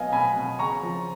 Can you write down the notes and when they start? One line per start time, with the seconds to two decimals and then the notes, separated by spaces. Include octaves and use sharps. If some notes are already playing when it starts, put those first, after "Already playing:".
Already playing: B2 F#3 B3 D#5 F5 G#5
0.12 B2 G#5 B5
0.36 B2
0.59 C#3 A#5 C#6
0.83 F3